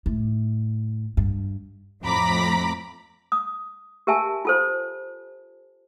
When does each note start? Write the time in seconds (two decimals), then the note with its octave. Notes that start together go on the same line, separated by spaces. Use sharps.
0.06 A2
1.17 G2
2.04 F2 A2 A#5 B5 D6 B6
3.32 D#6
4.07 G4 A#4 E5 G#5 A5
4.45 F4 A4 C5